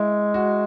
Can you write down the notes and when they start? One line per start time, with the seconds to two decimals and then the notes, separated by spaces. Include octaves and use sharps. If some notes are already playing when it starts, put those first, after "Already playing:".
Already playing: G#3 E4
0.34 F#4